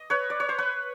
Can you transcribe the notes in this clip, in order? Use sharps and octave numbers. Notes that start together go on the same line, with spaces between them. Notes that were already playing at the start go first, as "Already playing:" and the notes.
Already playing: D#5
B4 C#5
D5
C#5
C5
B4 C#5